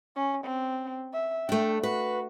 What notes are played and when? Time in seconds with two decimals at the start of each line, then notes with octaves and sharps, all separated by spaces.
0.16 C#4
0.45 C4
1.13 E5
1.49 A3 D4 G5
1.83 F#4 B4